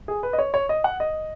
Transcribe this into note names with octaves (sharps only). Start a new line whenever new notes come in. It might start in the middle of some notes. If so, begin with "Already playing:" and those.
G#4
B4
D#5
C#5
C#5
D#5
F#5
D#5